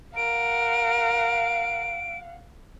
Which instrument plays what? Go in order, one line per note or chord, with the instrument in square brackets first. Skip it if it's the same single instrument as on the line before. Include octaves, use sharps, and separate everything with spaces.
[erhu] A#4 [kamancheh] F5 F#5 [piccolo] D7